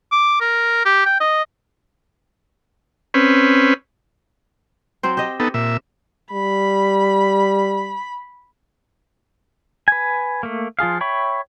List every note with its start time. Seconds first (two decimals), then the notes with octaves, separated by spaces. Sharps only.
0.12 D6
0.41 A#4
0.85 G4
1.05 G5
1.20 D#5
3.14 C4 C#4 B4
5.03 F#3 C4 C5
5.17 G4 D#5
5.40 B3 D#4 A4
5.54 A#2 E5
6.33 G3 B5
9.88 B4 G#5
10.43 A3 A#3
10.79 F3 F4 G#4 F5
11.01 C#5 E5 G5 B5 C#6